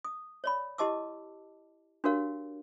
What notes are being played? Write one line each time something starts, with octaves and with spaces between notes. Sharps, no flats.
D#6
C#5 D5 B5
E4 G4 D#5 A5 D6 E6
D4 F#4 G4 A#4 C#5 F5